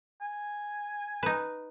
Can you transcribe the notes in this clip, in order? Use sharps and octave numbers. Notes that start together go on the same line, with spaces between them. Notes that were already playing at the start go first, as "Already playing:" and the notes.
G#5
D#4 B4